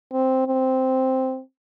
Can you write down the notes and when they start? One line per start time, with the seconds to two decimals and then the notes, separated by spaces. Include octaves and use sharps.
0.12 C4
0.47 C4